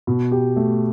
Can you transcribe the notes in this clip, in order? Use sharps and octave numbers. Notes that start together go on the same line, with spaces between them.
B2
G4
A3